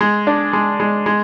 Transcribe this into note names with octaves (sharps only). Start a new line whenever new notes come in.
G#3
D4
G#3
G#3
G#3